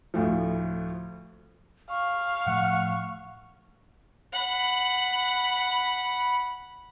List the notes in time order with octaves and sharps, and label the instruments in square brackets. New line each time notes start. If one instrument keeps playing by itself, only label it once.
[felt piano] D2 A2 F3
[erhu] F5 [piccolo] C#6
[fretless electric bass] A2 F3 A3 [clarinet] F#5
[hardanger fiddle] F#5 B5